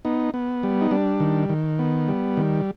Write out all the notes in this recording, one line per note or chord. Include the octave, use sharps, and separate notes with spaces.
B3 D#4
B3
G3
D#4
G3 D4
D#3
D#3
B3
G3
D#3